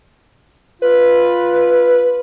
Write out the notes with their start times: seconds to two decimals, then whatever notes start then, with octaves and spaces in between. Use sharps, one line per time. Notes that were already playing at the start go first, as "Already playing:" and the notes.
0.82 F4 B4